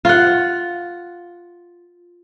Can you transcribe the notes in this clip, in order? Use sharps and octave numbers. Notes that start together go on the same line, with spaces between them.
F4 F#5